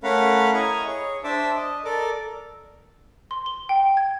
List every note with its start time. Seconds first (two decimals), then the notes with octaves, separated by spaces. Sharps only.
0.04 A3 C#4 A#4 F5 F#5 B5
0.54 E4 D#5 G#5 A#5 C#6
0.87 G#4 C#5
1.24 D4 C5 E5 A5 D6
1.56 D#5
1.85 A4 A#4 D5 D6
3.31 C6
3.46 G7
3.69 G5
3.97 G#6